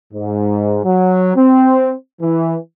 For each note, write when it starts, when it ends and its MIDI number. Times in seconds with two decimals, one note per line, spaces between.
0.14 0.79 44
0.85 1.35 54
1.36 1.92 60
2.21 2.56 52